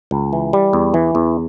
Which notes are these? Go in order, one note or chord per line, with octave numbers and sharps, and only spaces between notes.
C#2
E3
G3
E2
E3
E2